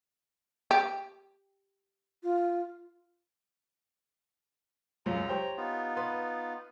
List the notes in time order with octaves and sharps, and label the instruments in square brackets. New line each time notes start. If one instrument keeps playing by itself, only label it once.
[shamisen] G4
[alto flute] F4
[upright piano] C#2 F#2 [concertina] A#5
[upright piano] G4 C5 C#5
[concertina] B3 D#4 F4
[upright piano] B4 C6